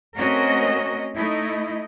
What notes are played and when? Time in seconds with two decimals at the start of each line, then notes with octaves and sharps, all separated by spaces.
0.18 A3 C4 C#4 F#4 A#4 D#5
1.17 A3 D#4 E4 D#5